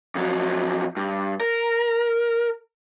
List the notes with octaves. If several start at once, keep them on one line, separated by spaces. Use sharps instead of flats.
F2 F#3
G2
A#4